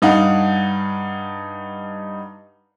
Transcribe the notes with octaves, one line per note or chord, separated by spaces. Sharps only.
G2 D#4 F5 F#5